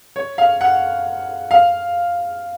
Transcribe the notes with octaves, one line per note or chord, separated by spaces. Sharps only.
C#5
F5
F#5
F5